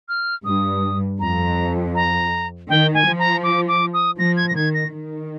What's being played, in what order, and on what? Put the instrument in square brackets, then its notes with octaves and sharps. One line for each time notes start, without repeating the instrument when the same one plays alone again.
[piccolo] F6
[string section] G2 [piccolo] D#6
[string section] F2 [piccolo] A#5
[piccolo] A#5
[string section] D#3 [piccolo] G5
[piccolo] G#5
[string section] F3
[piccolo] A#5
D6
D6
D#6
[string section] F3 [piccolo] A#6
[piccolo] G#6
A#6
[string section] D#3 [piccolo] G#6
[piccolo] A#6
[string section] D#3